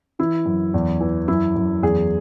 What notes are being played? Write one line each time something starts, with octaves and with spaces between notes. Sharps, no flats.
E3 E4
F#2
E2
E3
F#2 E4
F#2
E2 G#4